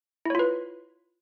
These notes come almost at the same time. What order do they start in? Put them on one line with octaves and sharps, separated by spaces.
E4 C#5 F4 B4